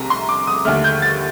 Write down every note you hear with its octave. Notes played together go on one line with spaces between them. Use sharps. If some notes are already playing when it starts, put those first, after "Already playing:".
Already playing: C2 C3 A#5
C6
D6
D#6
D#2 D3 A3 F6
G6
A6